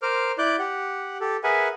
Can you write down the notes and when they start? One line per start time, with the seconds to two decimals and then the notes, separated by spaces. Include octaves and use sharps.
0.02 A#4 C5 D6 F6
0.38 E4 D5 D6 F#6 G6
0.59 G4 F#5
1.21 G4 A4
1.44 G#4 A#4 B4 E5 F#5 G#5